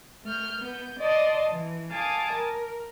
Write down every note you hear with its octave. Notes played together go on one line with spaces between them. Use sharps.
A3 F6 G6
B3 G6
D5 D#5 A5 C6 D#6
E3
F5 G#5 A5 D6 D#6
A#4